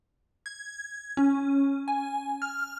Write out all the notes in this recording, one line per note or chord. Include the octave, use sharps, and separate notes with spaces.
G#6
C#4
G#5
F6